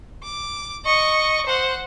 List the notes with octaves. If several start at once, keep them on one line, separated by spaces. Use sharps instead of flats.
D6
D#5 C#6
C5 F#5